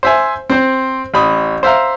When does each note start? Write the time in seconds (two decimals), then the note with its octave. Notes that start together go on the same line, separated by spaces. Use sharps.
0.03 C5 E5 G#5
0.50 C4 C5
1.14 A1 B5 D#6
1.63 C5 E5 F5 A#5